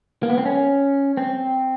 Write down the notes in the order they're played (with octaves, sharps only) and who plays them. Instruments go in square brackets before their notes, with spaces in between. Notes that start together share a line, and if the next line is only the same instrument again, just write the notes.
[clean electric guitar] A#3
B3
C4
C#4
C4